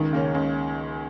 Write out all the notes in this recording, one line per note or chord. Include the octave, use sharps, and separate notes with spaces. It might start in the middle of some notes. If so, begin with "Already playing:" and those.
Already playing: C#2 D#3
C#3 A#3 C#4
C#2